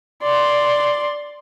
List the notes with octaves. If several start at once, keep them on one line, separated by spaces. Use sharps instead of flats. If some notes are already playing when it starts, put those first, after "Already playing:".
D5 C6